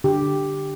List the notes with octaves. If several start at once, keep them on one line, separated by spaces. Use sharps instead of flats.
D3 G4